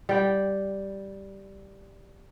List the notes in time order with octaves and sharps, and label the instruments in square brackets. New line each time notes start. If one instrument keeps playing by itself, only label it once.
[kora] G3 G5